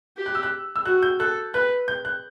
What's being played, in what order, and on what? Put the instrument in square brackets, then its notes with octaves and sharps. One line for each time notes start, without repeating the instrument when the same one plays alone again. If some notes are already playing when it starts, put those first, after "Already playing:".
[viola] G4
[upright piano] F#6
E6
F#6
E6
[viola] F#4 [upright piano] F#6
[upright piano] G6
[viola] A4 [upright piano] F#6
[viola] B4 [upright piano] F#6
[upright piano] G6
F#6